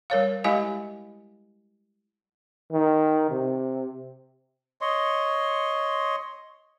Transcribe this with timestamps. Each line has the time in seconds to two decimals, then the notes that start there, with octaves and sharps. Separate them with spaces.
0.10 G3 A#4 C#5 F5
0.44 G#3 E4 G4 D#5 F5 G#5
2.73 D#3
3.31 C3
4.81 C#5 D#5 C6